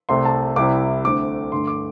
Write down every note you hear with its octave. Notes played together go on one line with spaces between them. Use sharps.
C2 C3 A3 C6
A5
C2 C3 G3 E4 D6
D2 D3 A3 C4 D6
G2 D3 A3 C6
D6